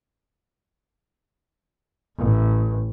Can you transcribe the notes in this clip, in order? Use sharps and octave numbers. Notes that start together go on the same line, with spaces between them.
A1